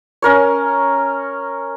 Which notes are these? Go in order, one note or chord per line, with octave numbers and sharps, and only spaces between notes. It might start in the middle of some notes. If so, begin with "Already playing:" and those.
C#4 A#4 C#5